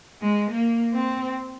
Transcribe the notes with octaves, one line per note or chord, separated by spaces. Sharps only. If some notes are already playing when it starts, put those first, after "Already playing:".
G#3
A#3
C4